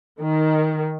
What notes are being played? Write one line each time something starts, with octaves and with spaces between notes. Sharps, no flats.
D#3